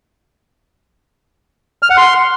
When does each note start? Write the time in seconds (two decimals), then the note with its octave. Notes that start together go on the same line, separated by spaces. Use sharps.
1.83 F6
1.90 F#5
1.97 C6